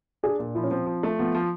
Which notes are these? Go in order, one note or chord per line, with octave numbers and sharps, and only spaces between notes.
D4 G#4
A#2
F3 E4
C#4
F3 C4
F3
A3
F3 B3
F3